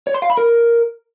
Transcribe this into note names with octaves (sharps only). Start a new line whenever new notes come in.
C#5
C6
F5
B5
A#4